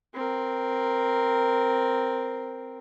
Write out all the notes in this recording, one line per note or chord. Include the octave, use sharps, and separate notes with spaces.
C4 A#4